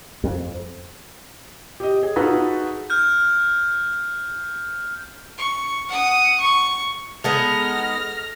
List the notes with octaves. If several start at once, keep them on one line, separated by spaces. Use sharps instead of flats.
F2
G4 D#5
G#4
D#4 F4 F#4 G#4 A4 B4
F6 G6
C#6
F#5 D#6
C#6
G#3 B3 D#4 A4 F6 A#6